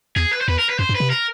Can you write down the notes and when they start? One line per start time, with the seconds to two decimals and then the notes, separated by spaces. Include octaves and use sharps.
0.16 E2 G#4
0.33 B4
0.41 C5
0.48 E2 B4
0.59 A#4
0.70 B4
0.79 F#2 C5
0.89 G2
0.95 C3 B4
1.10 A#4